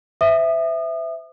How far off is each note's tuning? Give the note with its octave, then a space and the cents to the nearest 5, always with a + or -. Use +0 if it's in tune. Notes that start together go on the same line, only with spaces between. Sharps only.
C5 -30 E5 +0 D#6 -35